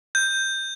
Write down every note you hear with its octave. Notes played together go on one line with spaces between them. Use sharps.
G6